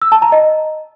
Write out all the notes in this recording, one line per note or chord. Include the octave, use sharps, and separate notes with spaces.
E6
A5
A#5
D#5